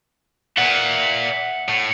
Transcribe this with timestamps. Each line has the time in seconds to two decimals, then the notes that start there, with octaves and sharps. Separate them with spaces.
0.58 A#2 E5 F#5
1.68 A2